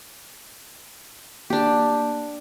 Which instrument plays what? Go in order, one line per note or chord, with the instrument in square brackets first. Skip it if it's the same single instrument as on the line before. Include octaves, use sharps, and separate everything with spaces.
[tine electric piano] A#3 [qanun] D4 G4